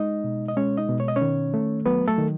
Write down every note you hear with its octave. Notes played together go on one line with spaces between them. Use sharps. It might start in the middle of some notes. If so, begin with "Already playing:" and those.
Already playing: G#3 D#4 D#5
B2
D#5
G#3 C#4 C#5
D#4 D#5
B2
C#5
D#5
C#4 C#5
D#3
A3
F#3 B3 B4
A3 A4
D#3